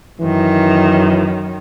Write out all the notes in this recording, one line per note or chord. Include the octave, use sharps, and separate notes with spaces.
F#2 D#3 E3